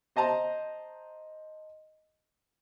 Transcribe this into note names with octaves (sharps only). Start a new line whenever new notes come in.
C5 D#5 A5 A#5 C6